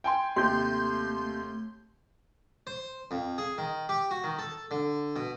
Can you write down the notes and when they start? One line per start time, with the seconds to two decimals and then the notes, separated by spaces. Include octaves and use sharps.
0.04 G5 G#5 C6
0.36 D#2 C3 A3 C6 G6
2.67 C5
3.11 F2
3.38 G#4
3.58 D#3
3.89 G4
4.11 F#4
4.24 D#3
4.39 A4
4.71 D3
5.16 B2